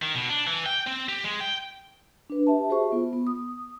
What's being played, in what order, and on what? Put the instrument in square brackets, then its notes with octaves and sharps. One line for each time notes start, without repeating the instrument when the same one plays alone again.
[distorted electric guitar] D#3
B2
D4
E3
G5
C4
G4
G#3
G5
[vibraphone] D4 B4
G4 E5 A5
F#4 G#4 C5 E5 C#6
B3 F4
B3
D#6